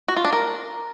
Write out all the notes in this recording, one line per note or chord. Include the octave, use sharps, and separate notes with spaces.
F#4
F4
D4
A#4